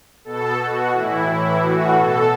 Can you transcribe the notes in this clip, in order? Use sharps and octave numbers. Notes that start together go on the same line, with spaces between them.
B2 A4
B2 F#4
A2 E3 E4
A2 E3 E4
A2 E3 F#4
B2 A4